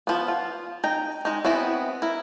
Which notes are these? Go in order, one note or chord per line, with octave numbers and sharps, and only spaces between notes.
F3 B3
F4
D#4 G5 A#5
G#3 D#4
B3 C4 E4 G#4 D#5
E4 A#4